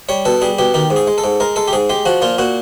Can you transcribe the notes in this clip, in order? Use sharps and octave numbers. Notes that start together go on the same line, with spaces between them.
G3 C#5
B2 A4
G3 G#4
B2 G4
D#3 G4
G#2
G#4
G#3
A4
G#2
G#3 A#4
G#3 A4
G4
G#2 G#4
G#3 G4
F3 F#4
A#2 F4
A#2 F#4